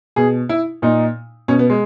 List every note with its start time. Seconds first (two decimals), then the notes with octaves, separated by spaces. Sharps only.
0.16 B2 G#4
0.49 E4
0.82 A#2 D#4
1.48 B2 C#4
1.59 B3
1.70 G#3